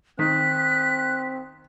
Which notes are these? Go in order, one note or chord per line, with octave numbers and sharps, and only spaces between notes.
D#3 C4 F#6 B6